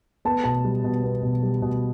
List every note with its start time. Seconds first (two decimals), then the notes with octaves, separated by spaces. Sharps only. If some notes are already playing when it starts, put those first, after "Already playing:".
0.25 B3 A5
0.44 B2 A5
0.64 G3
0.84 B2
1.03 B3
1.23 B2
1.43 G3
1.62 B2